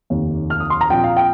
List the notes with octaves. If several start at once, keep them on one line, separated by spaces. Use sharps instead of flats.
F1 D#2 D#3
F6
D#6
C6
A#5
A#1 A#2 F3 C4 G5
F5
G5